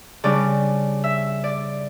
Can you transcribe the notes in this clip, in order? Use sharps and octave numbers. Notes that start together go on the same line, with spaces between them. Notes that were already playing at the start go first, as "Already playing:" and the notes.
C#3 G3 D4 D5
E5
D5